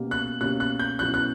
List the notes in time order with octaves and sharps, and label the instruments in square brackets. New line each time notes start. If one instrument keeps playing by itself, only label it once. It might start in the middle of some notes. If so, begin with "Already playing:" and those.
Already playing: [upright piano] B2 A#3 C#4 G4
[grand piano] F#6
[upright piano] B2 A#3 C#4 G4 [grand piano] F#6
[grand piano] F#6
G6
[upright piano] B2 F#3 C#4 E4 [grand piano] F#6
[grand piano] F#6